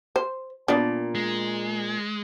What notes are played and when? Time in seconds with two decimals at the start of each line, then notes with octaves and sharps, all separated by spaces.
0.16 C5
0.68 A#2 B3 D4
1.15 G#3